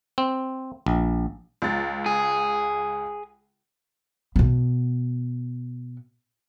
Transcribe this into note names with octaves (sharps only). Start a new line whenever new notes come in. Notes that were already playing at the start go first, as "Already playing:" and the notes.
C4
A#1
C#2 A6
G#4
B2 B3